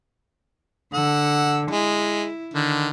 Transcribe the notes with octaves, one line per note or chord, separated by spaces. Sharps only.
D3 F#5 E6
G#3 E4
D3 D#3